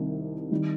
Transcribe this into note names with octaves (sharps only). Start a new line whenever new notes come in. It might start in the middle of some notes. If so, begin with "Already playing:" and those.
Already playing: C2 C3 D#3 G3
D#3 G3